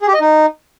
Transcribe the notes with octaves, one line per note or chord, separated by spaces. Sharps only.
G#4
G4
D#5
D#4